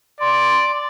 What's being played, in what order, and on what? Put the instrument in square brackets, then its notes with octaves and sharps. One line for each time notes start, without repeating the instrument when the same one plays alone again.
[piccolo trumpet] D5 [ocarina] C6